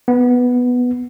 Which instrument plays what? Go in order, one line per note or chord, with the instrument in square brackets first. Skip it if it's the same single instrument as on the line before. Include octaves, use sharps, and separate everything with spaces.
[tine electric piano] B3